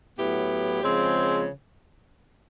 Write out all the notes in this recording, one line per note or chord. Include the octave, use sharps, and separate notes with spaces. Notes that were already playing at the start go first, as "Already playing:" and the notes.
A2 F#3 B3 E4 G4
C#3 F3 G#3 C4